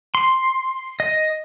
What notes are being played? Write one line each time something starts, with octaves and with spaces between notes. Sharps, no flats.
C6
D#5